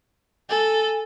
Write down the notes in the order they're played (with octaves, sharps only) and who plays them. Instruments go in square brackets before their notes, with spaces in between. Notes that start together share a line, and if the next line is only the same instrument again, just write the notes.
[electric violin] A4 [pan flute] G#5